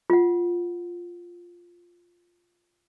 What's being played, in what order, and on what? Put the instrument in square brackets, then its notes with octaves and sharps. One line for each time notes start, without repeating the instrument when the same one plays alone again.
[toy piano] F4 F#5